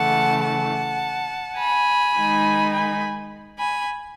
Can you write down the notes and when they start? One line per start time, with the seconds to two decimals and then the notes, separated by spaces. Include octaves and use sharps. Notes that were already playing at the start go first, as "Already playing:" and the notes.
Already playing: C#3 E3 A3 F#5 A5
0.43 F#5 A5
1.58 G#5 B5
2.15 D#3 G#3 D#4
2.72 G#5 B5
3.58 G#5 B5